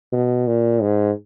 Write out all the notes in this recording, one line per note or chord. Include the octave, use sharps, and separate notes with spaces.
B2
A#2
G#2